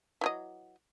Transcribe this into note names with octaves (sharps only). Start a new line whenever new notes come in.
E3 F#3 D#5